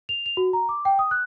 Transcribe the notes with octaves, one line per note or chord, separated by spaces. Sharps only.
F7
F7
F#4
A#5
D6
G5
D#6
F#6